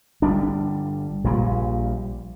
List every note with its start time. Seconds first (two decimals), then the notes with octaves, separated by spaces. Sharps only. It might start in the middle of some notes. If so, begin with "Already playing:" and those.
0.22 G1 G3 D4
1.24 A#1 A#2 E3 G3